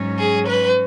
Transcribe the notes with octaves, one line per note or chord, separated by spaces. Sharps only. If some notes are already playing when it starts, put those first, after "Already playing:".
Already playing: G#2 F#3 C#4
G#4
B4